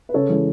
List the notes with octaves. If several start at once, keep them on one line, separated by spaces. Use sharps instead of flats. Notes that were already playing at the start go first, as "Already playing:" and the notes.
B4
C#3 A4 C#5
E3 G#3